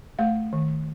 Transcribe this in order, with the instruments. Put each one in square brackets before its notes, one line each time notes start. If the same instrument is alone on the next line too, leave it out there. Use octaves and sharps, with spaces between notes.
[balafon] A3 F5
D#3